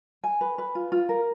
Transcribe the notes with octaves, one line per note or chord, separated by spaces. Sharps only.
G#5
B4
B4
F4
F4
A#4